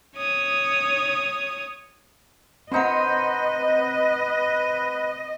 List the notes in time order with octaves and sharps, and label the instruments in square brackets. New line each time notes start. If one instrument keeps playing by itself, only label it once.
[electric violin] C#5 D#6
[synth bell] C4 F#5 [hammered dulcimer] D#4 C5 C6 [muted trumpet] B4 [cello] D#5